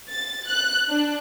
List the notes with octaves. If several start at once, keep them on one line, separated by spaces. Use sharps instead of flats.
A6
F#6
D4